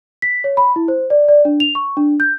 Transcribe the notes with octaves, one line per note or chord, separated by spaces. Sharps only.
B6
C#5
B5
E4
C5
D5
D5
D4
F7
C#6
D4
G6